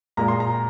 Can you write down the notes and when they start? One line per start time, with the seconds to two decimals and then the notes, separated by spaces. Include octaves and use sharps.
0.17 A#2 G#3 A#5
0.28 C6
0.40 A#5